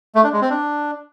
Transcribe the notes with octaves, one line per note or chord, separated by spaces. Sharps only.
A3
D4
G#3
C4
D4